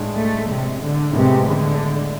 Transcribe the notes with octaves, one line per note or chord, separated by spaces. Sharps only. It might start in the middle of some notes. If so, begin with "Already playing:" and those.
Already playing: A2 G#3 D4
A3
C3
D3
A2 C3 G#3 B3
D3